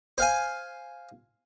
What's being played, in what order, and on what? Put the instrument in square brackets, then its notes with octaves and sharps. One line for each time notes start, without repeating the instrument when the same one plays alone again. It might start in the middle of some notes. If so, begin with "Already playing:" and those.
[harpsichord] C5 F5 G#5